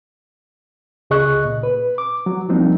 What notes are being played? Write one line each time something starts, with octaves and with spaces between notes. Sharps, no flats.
C#2 C#3 G#4 D#5 C#6 F#6
A#2
B4
D6
F#3
F3 G3 A#3 C4 D4 D#4